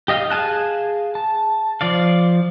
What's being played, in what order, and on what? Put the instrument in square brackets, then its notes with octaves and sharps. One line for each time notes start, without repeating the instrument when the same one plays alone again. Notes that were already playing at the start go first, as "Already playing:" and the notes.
[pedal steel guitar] G4 D#5 F5 D#6 F6
G#4 F5 G#5 A5 F#6
A5
F3 D5 F5